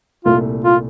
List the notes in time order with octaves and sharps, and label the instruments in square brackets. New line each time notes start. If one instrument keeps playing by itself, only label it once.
[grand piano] C2 A#2 A3 [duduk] F4
[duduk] F4